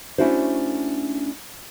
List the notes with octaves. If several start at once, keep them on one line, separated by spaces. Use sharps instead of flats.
A3 C#4 D4 E4 F#4 C5